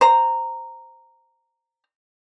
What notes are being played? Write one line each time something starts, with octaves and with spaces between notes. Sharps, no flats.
C5 A#5